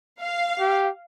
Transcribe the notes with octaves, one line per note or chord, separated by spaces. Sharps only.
F5
G4